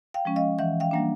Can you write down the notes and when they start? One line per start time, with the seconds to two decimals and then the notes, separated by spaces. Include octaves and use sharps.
0.14 F5 G5
0.25 F3 G#3 C#4
0.36 D#5 F5
0.59 E3 E5 F#5
0.80 F5 G5
0.91 G3 A#3 D4 F#5